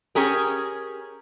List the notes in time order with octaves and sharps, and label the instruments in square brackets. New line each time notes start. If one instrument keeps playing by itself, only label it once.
[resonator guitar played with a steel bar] C#4 G4 G#4 A#4